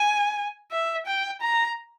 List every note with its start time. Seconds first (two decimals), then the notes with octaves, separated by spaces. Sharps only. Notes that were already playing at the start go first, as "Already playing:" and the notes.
Already playing: G#5
0.72 E5
1.06 G5
1.41 A#5